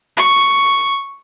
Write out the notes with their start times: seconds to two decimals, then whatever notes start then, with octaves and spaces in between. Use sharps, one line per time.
0.17 C#6